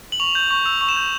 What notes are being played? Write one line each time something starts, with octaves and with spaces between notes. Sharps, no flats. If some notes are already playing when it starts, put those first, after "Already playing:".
F#7
C#6 F7
G6
C#6
E6 F7
C#6
E7
G6